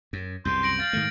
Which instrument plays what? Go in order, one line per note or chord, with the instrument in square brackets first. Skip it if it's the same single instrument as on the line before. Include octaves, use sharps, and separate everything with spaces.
[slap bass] F#2
[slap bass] C2 F#2 B2 [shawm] C6 [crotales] G6
[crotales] A#6 D7 F#7
[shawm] F5 [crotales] A6 F#7
[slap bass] G#2 D#3 A3